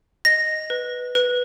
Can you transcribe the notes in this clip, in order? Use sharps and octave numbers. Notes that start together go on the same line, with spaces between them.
D#5 A#6
B4
B4